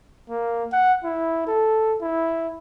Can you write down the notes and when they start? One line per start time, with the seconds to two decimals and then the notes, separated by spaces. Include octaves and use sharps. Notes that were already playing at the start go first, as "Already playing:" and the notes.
0.30 A#3
0.72 F#5
1.04 E4
1.47 A4
2.02 E4